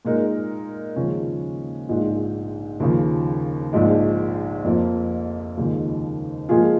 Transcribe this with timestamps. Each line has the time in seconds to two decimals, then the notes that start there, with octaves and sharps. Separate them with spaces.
0.05 A#2 G#3 D#4 A#4
0.96 D#2 C#3 F3 G#3 C#4
1.89 A#1 G#2 G#3 F4
2.80 D#2 C#3 F3
3.73 A#1 G#2 F3 G#3
4.64 F2 F3 A#3
5.57 D#2 C#3 F3 G#3 D#4
6.49 A#2 F3 G#3 F4 G#4